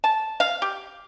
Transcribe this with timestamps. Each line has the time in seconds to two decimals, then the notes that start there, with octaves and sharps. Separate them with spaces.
0.04 A5
0.40 F5
0.62 G4